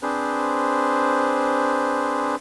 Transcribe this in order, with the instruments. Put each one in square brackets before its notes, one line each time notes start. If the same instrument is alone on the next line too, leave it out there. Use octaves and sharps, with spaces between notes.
[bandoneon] C4 D4 G#4 B4 C5